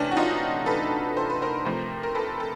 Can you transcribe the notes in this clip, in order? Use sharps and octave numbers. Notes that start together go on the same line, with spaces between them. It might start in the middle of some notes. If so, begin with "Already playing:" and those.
Already playing: C3 E3 A3 C#4 D4
F#4
D#4 F4
A4 B4
C5
B4
A#4 C5
C3 F3 A3
A#4
A4 B4
A4